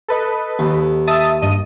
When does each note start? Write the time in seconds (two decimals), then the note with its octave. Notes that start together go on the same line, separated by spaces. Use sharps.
0.08 A4 B4 D#5
0.59 D#2
1.07 E5 A5 D#6
1.42 G2 D#5 D#7